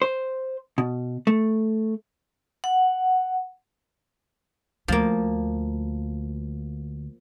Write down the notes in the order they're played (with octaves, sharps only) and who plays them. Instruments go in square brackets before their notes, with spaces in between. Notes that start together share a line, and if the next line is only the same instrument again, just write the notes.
[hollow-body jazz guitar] C5
B2
A3
[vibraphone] F#5
[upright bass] D2 [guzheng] F3 A#3